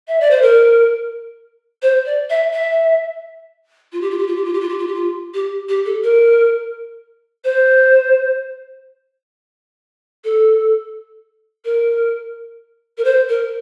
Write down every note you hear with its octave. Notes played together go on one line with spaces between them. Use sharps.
E5
D5
C5
A#4
C5
D5
E5
E5
F4
G4
F4
G4
F4
G4
F4
G4
F4
G4
F4
G4
F4
G4
G4
A4
A#4
C5
A4
A#4
A#4
C5
A#4